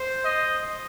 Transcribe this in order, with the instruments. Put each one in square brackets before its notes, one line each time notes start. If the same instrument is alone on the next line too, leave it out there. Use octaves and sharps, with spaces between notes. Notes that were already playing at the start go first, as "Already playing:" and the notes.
Already playing: [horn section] C5
[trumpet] D#5